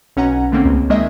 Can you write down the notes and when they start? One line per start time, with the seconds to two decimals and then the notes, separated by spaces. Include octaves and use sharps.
0.17 B1 C#4 F#5 A#5
0.52 D3 A3 A#3 C4 C#4
0.65 C#2
0.90 D#3 G#3 A#3 D#5 E5